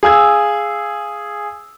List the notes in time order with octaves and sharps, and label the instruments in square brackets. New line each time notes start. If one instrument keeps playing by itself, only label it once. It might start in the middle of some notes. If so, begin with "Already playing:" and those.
[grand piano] G#4 F5 E6 G#6